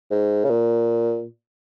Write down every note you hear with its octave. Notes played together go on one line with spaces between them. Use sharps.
G#2
C#3
A#2